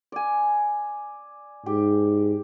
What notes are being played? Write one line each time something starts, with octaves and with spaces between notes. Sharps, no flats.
D5 G#5
G#2 G4